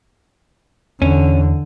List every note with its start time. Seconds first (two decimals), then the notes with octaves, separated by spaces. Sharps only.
1.02 E2 D3 C#4